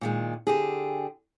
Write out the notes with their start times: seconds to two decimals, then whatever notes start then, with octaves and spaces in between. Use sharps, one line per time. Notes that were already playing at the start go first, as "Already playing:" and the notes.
0.01 A#2 D#3 G#3
0.47 D3 G4 G#4